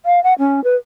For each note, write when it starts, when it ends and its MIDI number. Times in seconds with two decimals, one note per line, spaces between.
0.06 0.22 77
0.24 0.33 78
0.39 0.63 61
0.64 0.76 71